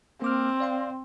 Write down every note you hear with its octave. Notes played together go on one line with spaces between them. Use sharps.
A#3 C4 D6 F6
D5 F5 C6